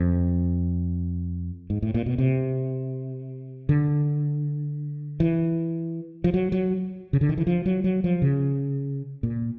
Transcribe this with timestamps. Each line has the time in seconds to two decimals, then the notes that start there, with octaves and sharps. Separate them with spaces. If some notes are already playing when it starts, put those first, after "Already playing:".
Already playing: F2
1.70 G#2
1.82 A2
1.94 A#2
2.06 B2
2.18 C3
3.69 D3
5.20 E3
6.24 F3
6.34 F#3
6.52 F#3
7.13 C#3
7.21 D3
7.29 D#3
7.38 E3
7.47 F3
7.66 F#3
7.84 F#3
8.04 F3
8.22 C#3
9.23 A#2